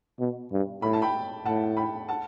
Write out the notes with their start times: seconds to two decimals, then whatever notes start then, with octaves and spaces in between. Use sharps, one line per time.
0.20 B2
0.52 G2
0.82 A2 B5
0.93 A5
1.02 G5 B5
1.45 A2 F#5 A5
1.77 G5 B5
2.09 F#5 A5